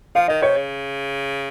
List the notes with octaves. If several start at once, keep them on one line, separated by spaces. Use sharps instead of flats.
F3 F5
D#3 D#5
C3 C#5
C#3